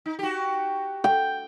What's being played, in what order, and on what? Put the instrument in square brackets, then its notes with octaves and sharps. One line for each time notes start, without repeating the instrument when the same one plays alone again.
[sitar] D#4
F#4 G4
[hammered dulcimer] G5